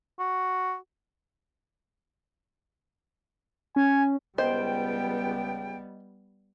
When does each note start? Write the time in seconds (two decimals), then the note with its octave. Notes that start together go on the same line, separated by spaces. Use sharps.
0.20 F#4
3.76 C#4 G#5
4.38 C#2 G3 B3 C5 D#5 G5